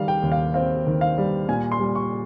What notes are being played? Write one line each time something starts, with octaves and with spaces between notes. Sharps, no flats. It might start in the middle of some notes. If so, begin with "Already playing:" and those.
Already playing: D#3 G3 F5
G5
D#2
F5
C4 F5
D#3
F5
G3
A#2 G#5
C6
G3
C#6